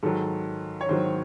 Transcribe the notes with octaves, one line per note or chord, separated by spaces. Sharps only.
G#2 D#3 F#3 A4
C#5
G#2 D#3 F#3 C5